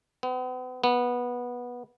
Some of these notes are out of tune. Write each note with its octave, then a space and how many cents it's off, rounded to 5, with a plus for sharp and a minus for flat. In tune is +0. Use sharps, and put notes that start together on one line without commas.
B3 +40
B3 -15